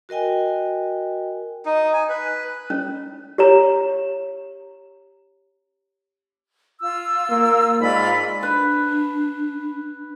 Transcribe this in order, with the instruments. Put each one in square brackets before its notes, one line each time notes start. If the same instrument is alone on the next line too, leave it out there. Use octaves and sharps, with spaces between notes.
[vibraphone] F#4 A#4 D#5 G5 G#5
[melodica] D#4
G#5
B4
[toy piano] C#4
G4 C#5 A#5
[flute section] F4 E6
[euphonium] A#3
[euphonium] G#2 [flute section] F4 D5 B5
[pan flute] D4 [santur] B4